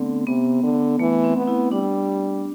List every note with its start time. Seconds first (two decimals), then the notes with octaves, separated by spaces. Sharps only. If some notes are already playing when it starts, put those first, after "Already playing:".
Already playing: D3 A3 B3 C4
0.27 C3 B3
0.63 D3
0.99 E3 A3
1.24 C4
1.36 B3
1.47 E4
1.72 G3 D4